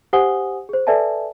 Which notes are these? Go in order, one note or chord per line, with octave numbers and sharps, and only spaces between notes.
G4 C5 F#5 G#5 D#6 G7
G#4 C5
A4 B4 D5 E5 G#5 A5